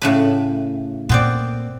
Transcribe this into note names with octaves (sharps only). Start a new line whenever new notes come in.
A2 C#3 B4
A#2 B3 C4 D5